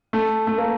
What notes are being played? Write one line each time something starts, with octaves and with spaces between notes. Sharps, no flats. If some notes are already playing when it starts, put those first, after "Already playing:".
A3
A3
A#3